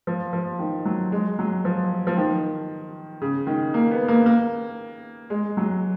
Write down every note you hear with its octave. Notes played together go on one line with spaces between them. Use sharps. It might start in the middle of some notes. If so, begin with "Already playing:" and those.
F3
F3
D#3
F#3
G#3
F#3
F3
F3
D#3
C#3
D#3
A#3
B3
A#3
A#3
G#3
F#3